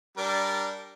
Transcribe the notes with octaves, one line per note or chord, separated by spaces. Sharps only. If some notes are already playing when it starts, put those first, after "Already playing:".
G3 D4 A#4